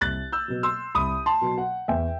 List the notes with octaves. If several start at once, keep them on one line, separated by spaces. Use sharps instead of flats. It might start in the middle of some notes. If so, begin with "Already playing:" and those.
C2 F#6 A6
E6 G6
B2 F#3
C6 E6
C2 B5 D#6
A5 C6
B2 F#3
F#5
E2 E5 G5